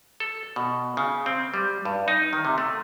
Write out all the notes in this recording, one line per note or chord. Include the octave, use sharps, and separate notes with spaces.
A4
B2
C#3
C4
G3
G2
D#4
D#3
C3
A3